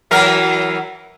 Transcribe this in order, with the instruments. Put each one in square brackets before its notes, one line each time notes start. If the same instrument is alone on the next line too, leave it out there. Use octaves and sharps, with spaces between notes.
[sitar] E3 F#3 A#4